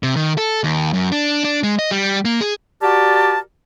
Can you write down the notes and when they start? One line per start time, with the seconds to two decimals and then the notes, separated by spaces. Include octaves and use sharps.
0.03 C3
0.16 D#3
0.38 A4
0.64 D#2
0.93 F#2
1.12 D4
1.44 D4
1.63 G#3
1.79 D#5
1.91 G3
2.25 A#3
2.41 G#4
2.82 F#4 G4 A#4 D5 A5